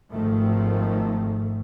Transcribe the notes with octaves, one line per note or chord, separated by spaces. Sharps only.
G#1 G#2 D#3 F3 A3